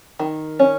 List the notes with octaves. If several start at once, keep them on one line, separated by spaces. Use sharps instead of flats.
D#3
C#4